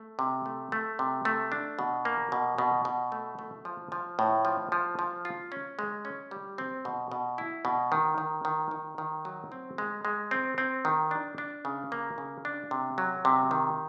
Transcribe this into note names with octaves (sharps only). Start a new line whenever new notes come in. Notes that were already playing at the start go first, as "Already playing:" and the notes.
Already playing: A3
C3
A3
A3
C3
A3
D4
B2
A#3
B2
B2
B2
A3
A3
F3
F3
A2
F3
F3
F3
F4
C#4
G#3
C#4
G3
C4
B2
B2
E4
B2
D#3
D#3
D#3
D#3
D#3
F#3
C4
G#3
G#3
C4
C4
D#3
D4
D4
C#3
A#3
C#3
D4
C3
F#3
C3
D#3